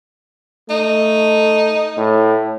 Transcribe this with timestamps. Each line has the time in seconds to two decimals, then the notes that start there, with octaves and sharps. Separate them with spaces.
0.70 A3 D#4
1.97 A2